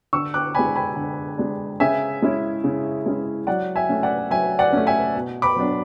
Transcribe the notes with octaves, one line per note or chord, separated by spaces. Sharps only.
D3 C#6 E6
D6 F#6
G#3 D4 G#5 B5
G#5 B5
D3
G#3 D4
C#3 E5 G#5
G#3 C#4 E4
C#3
G#3 C#4 E4
F#3 D5 F#5
E5 G#5
A3 C#4
D5 F#5
F#3 E5 G#5
D5 F#5
A3 C#4
E5 G#5
B2
B5 D6
F#3 B3 D4